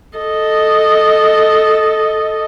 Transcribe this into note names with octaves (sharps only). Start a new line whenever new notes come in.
A4 D#5